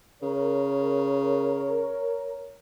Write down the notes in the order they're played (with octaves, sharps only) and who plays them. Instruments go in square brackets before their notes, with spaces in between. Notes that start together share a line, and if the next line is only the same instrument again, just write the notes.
[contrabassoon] C#3 [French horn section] A#4 C#5